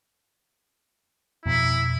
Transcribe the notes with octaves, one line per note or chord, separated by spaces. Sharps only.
F2 B2 E4